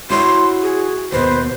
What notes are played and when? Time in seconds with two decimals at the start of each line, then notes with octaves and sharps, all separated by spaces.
0.10 E4 F#4 C#5 C6
0.62 G#4
1.12 D#2 B2 B4 C5